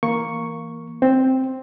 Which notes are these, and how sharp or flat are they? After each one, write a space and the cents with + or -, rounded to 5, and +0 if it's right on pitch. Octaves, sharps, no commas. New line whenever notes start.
E3 +0 A#3 +0 C#6 +0
C4 +0 C5 +5